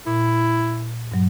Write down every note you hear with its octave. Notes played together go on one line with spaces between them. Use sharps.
A#2 E4
G2 F#3